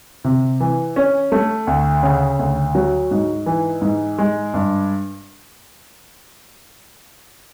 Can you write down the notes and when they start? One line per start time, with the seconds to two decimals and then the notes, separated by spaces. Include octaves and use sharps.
0.24 C3
0.60 E3
0.96 C#4
1.32 A3
1.67 D2
2.03 C#3
2.39 D2
2.75 F#3
3.11 G#2
3.46 E3
3.82 G#2
4.18 G#3
4.54 G2